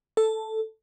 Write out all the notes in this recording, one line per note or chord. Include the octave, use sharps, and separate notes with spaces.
A4